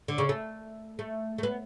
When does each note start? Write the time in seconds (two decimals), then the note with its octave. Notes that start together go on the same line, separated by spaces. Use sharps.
0.08 D3
0.18 C#3
0.29 A3
0.99 A3
1.38 A3
1.43 B3